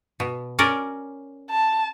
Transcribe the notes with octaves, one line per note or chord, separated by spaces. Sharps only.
B2
C#4 A#4 D5
A5